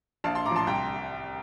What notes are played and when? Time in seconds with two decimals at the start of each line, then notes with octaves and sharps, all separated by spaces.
0.24 A#1 F5 A5
0.35 A5 C6
0.45 A2 A#5 D6
0.50 F3
0.56 A5 C6
0.67 C2 G5 A#5